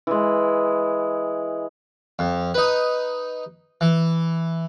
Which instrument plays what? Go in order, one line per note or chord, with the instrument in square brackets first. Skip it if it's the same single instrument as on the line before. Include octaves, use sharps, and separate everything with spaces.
[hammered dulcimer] E3 G#3
[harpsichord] F2
D#4 B4
E3